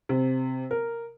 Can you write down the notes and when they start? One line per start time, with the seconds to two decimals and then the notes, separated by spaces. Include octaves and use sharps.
0.09 C3
0.71 A#4